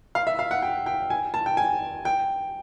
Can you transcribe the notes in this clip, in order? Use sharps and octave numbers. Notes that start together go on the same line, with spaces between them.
F5
E5
F5
F#5
G5
G5
G#5
A5
G5
G#5
G5